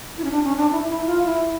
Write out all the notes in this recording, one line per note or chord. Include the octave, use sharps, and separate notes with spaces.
E4
C#4
D4
C#4
D4
E4
E4
F4
E4